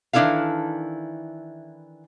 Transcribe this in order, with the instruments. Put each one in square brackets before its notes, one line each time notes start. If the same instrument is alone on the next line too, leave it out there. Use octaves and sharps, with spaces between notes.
[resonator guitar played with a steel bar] D#3 E3 D4 E4 A4 F5